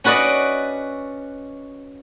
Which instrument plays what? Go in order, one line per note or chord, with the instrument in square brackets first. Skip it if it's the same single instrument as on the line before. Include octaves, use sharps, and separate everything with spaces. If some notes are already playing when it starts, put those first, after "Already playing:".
[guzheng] C#4 F#4 B4 D5 D#5 F#5